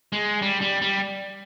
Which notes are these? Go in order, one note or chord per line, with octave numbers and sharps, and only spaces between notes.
G#3
G3
G3
G3